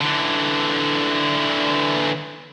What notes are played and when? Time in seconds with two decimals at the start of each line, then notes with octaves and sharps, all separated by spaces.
0.01 D3 E3